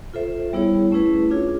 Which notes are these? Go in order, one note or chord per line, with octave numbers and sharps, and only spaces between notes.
F4 A4 C5 E5
G3 B3 E4 G#4 C#5
A3 C#4 E4 G#4 B4
D4 F4 G#4 C#5